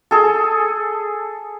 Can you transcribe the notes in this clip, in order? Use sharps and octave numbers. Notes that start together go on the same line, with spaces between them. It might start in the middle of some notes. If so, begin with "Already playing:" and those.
G#4 A4